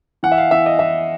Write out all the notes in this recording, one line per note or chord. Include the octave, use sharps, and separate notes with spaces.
E3 F#5
E5
F5
E3 E5
D#5
E3 E5